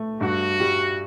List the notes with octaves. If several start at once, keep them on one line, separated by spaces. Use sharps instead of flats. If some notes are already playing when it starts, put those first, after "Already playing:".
Already playing: A3
G2 F#4
G3